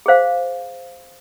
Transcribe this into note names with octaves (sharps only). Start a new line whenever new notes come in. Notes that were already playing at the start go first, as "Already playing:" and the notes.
G#4 C5 F5